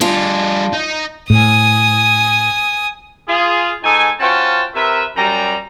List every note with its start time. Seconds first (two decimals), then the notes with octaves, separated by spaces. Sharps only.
0.01 G3 D4 F4 G#4
0.73 D#4
1.30 A2 G#5 D#6
3.28 F4 G#4
3.83 G#2 D#4 A4 G#5
4.20 C#4 F4 F#4 C5 G5 A5
4.75 C3 A#4 B4 E5
5.17 F#2 G3 A#5